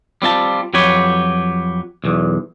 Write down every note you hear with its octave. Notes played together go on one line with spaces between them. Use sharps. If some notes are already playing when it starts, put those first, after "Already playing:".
G3 C4 F4 A5
F2 F#3 G4 B4 C#5
B1 E2